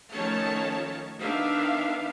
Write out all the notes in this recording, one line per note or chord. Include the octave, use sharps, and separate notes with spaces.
D#3 F3 A3 C#4 C#5 A5
D#3 B3 D4 E5 F5